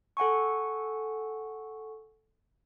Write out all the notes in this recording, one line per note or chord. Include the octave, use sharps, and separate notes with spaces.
A4 F#5 G#5 C#6